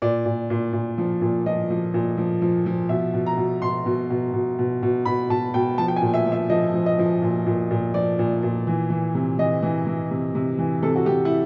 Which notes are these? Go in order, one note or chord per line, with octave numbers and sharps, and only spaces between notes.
A#2 D5
A#2
A#2
A#2
F3
A#2
F3 D#5
F3
A#2
F3
F3
F3
B2 E5
B2
A#5
B2
B2 C6
B2
B2
B2
B2
B2
B2 B5
B2 A5
B2 G5
F3 A5
G5
G#5
A#2
E5
F3
E5
F3 D#5
F3
D#5
F3
A#2
A#2
A#2
F3 D5
A#2
A#2
E3
E3
C3
E3 D#5
E3
E3
C3
C3
E3
C3 A4
F#4
C3 G4
E4